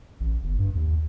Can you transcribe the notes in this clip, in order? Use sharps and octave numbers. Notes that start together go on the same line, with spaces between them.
A1
G1
G2
D#2